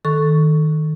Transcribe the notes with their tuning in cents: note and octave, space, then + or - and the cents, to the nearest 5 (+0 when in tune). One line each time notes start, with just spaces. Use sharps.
D#3 +0 A4 -10 C#6 +0